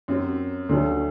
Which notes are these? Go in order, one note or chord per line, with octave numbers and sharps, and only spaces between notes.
F#2 F#3 C4
D2 D3 F#3 A3